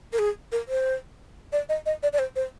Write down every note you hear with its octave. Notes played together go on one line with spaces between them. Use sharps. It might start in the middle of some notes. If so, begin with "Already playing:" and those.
A#4
G#4
A#4
C5
D5
D#5
D#5
D5
D5
C5
C5